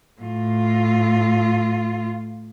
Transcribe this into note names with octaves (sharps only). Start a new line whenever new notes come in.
A2 F4